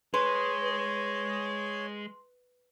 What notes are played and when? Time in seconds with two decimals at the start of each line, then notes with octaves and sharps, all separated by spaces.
0.14 G#3 G#4 B4 C#5 C6